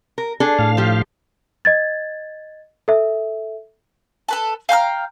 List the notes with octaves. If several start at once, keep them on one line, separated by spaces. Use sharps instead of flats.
A#4
D4 G#4 A4
A2 F5
F3 G4
D#5 G#6 A6
A4 E5
A4 B4 A5
F5 G5 A#5 F6